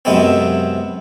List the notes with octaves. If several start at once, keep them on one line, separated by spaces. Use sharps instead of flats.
F#2 C3 G#3 B3 C4